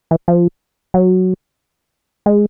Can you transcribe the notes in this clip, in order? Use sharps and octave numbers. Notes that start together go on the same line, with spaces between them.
E3
F3
F#3
G#3